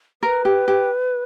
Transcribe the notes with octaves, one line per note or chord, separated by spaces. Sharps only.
A#4 B4
G4
G4